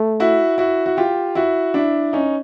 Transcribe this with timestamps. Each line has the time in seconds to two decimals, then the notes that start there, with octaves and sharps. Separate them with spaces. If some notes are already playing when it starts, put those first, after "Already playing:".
Already playing: A3
0.20 E4 F#4
0.58 E4 F#4
0.86 F#4
0.97 F4 G4
1.35 E4 F#4
1.74 D4 E4
2.13 C#4 D#4